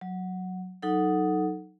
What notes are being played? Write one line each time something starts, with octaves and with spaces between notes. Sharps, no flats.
F#3
F#3 D#4 A4 F#5